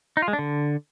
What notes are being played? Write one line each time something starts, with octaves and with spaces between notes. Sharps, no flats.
D#4
F4
G#3
D4
D3